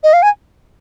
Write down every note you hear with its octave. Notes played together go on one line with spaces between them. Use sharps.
D#5
F5
G#5